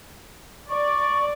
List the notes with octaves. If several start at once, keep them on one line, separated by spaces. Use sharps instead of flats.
D5 C#6